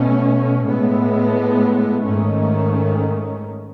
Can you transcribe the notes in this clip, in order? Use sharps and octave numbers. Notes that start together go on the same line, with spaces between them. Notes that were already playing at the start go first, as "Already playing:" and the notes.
Already playing: B2 A3 C#4
A2 G#3 B3
G#2 D#3 A3 C#4